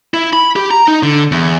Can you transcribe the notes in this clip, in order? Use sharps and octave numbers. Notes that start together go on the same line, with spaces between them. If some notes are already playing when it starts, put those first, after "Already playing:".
E4
B5
G4
A#5
D#4
D3
E2